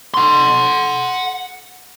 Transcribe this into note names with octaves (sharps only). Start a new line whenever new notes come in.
F#5 C6